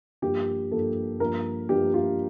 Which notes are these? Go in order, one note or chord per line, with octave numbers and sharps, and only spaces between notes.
G2 F3 A#3 G4
G2 F3 A#3 A4
G2 F3 A#3 A#4
G2 F3 A#3 G4
F4